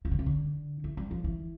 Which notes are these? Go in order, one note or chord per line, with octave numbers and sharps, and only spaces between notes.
E3
D3
C3
D3
E3
G3
F3
E3